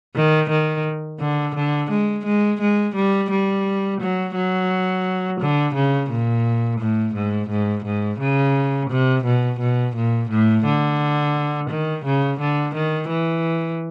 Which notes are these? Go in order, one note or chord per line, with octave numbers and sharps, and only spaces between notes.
D#3
D#3
D3
D3
G#3
G#3
G#3
G3
G3
F#3
F#3
D3
C#3
A#2
A2
G#2
G#2
G#2
C#3
C3
B2
B2
A#2
A2
D3
D#3
C#3
D3
D#3
E3